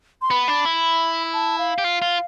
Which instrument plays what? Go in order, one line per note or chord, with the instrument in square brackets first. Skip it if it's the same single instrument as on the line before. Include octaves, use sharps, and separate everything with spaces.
[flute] C6
[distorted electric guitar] B3 [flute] B5
[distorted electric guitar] D4
E4
[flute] A5
F5
[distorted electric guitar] G4
F4
F4